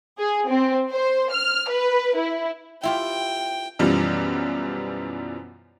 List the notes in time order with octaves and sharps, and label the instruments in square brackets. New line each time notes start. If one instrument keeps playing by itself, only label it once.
[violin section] G#4
C4
C5
F6
B4
E4
[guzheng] E4 F4 G4 [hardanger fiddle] G5
[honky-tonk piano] F#2 B2 E3 F3 G3